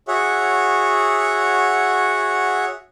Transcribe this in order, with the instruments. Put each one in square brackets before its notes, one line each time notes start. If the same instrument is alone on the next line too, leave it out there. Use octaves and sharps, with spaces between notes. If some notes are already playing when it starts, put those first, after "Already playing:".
[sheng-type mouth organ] F#4 G#4 C#5 E5 F#5